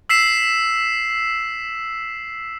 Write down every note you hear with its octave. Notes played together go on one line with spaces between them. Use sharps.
E6 B6 C7 E7